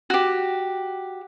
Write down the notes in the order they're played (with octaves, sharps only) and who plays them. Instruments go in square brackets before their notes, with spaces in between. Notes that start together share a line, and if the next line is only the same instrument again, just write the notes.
[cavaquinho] F#4 G4